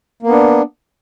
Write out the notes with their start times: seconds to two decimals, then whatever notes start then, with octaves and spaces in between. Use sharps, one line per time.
0.22 A#3
0.27 B3
0.31 D4